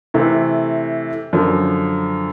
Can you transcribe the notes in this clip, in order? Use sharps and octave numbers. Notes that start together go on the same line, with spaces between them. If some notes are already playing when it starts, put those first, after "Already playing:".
C3 E3 A3
F#2 D3 F3